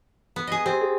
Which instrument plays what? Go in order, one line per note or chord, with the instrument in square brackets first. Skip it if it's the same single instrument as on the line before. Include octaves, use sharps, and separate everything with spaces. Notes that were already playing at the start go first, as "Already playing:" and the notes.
[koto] B3
G#4 D#5
[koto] C4 [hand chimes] G4
[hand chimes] G#4